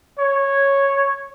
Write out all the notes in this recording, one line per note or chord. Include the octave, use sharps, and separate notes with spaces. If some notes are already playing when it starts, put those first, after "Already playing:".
C#5